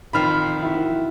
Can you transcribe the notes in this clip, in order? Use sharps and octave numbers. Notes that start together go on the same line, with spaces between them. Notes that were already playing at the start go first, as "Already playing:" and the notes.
F2 D#3 F3 B5 F6 C7
E4 F#4